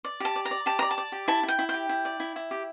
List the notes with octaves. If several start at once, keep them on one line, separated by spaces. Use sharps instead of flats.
D5
G4 A5
D5
A#5
D5
G4 A5
D5 A#5
A5
D5
G4
E4 A5
E4
G5
E4
G4 G5
E4
D5
E4
E4
G4